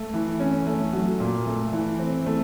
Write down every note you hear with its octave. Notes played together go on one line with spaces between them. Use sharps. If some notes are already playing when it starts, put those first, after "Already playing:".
Already playing: A3
E3
C#4
A3
F#3
A#2
A3
E3
C4
A3